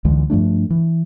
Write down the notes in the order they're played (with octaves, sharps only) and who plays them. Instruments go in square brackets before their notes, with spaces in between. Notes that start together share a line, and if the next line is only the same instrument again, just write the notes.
[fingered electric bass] C#2 D3 E3 G#3
G2 F3 A3 D4
E3